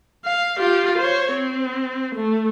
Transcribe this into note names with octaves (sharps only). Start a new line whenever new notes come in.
F5
F4 G4
C5 C#5
C4
A3